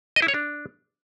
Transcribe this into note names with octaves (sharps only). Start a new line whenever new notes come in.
D#5
E4
C#5
D4